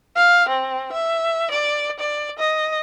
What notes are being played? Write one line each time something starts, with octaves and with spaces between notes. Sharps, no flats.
F5
C4
E5
D5
D5
D#5